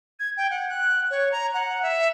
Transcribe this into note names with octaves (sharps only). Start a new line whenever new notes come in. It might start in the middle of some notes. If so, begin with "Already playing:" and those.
G#6
G5
F#5
F#6
C#5
A#5
F#5
E5